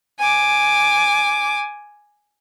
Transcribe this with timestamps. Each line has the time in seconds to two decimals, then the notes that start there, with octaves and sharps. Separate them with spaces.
0.19 G#5 D6